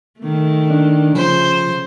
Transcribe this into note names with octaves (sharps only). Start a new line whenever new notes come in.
D#3 A3
D4
C#3 F3 C5